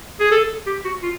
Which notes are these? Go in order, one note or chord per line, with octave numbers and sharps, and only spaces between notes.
G#4
A4
G4
F#4
F4